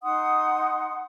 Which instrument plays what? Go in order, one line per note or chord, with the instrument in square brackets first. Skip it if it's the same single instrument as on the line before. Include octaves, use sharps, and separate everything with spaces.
[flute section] D#4 F#5 C6 D#6